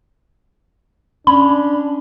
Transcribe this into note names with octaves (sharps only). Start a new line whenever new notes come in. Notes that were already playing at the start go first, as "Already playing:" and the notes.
C#4 D4 B5